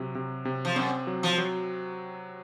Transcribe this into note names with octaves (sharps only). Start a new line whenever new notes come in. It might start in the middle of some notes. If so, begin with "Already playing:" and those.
Already playing: C3 F#3
C3
C3
F3
F#2 C4
F#3
F3
F#3